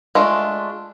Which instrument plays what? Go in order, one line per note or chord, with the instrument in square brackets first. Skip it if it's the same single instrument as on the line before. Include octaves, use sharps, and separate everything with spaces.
[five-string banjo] G#3 A3 D4 F4